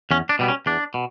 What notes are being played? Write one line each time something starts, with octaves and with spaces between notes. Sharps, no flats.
E2 C#4
D4
B2 G3 B3
C#4
E2 D4
B2